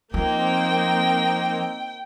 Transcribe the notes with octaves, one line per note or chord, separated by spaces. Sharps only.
F3 A#3 C4 D#4 G5